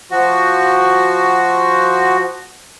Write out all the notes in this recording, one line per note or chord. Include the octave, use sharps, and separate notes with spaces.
F3 F#4